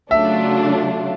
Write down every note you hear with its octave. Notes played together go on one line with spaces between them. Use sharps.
C#3 F#3 A3 D4 F4 E5